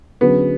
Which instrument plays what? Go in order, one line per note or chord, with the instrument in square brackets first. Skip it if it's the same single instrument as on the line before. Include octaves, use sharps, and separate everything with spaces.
[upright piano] D3 F#3 C#4 G#4 B4 [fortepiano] B3